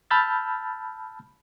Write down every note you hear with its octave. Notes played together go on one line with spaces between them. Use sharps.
A5 B5 E6 F6 G6 A6